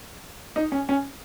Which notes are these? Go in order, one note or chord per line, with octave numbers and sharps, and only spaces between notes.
D#4
C#4
C#4